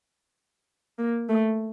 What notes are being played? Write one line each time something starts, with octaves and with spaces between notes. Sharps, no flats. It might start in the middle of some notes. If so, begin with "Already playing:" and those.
A#3
A3